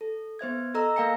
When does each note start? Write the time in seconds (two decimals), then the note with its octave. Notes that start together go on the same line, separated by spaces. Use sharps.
0.01 A4
0.39 B3 C5 E5 G#6
0.75 A4 D#5 A#5 E6
0.96 A#3 A#4 F5 G#5 A#6 C#7